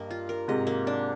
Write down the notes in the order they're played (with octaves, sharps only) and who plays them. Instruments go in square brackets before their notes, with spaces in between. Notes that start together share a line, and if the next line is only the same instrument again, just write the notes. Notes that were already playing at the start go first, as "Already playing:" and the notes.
Already playing: [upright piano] G2 [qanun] A#3 G4 D#5
[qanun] F4
A#4
[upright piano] G#2 C3 [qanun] D#5
[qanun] A#3
D4